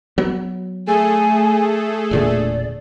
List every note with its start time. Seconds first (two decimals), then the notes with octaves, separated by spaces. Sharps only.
0.18 F#3 B3
0.87 A3 G#4 A4 G#5
2.11 E1 A#2 D3 D5